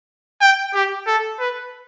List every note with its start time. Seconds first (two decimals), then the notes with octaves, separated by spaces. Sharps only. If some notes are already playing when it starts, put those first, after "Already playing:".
0.41 G5
0.74 G4
1.07 A4
1.40 B4